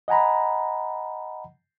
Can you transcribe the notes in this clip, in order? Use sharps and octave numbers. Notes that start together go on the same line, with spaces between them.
D#5 F#5 G#5 A#5 B5